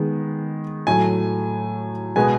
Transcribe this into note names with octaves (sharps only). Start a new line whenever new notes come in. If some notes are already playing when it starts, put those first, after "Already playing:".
Already playing: D#3 G#3 B3
A2 F#3 A3 G#5
B2 G#3 B3 G#5